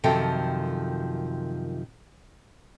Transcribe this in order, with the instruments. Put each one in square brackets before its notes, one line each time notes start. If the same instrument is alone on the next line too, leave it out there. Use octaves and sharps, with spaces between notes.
[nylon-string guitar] F#2 C3 D#3 F3 A4 G5